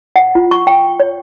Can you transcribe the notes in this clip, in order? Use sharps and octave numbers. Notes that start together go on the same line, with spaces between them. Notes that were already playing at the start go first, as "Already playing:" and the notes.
F#5
F4
C#6
G5
C#5